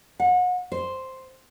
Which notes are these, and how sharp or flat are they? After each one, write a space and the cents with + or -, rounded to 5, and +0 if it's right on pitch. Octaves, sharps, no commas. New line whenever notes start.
F#5 -35
C5 +0